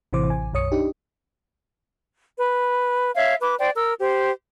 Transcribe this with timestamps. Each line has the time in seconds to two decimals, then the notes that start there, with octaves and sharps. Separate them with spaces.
0.13 A1 C3 E3 C5 D6
0.30 A1 G#5
0.53 B1 F#2 C#5 D#6 C#7
0.72 D4 D#4 G4
2.37 B4
3.15 C#5 E5 F5
3.40 B4 D6
3.58 C5 D5 G5
3.76 A#4 E6
3.99 G4 C5